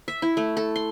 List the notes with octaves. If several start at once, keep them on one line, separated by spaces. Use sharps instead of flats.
E5
E4
A3
A4
C6